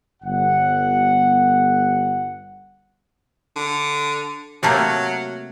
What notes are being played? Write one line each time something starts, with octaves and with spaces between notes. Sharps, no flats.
G1 F#5
D3
C3 F#3 A3 A#3